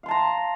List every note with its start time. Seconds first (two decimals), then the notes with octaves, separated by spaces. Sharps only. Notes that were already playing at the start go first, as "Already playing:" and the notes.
0.03 F5
0.06 C6
0.08 A5
0.11 A#5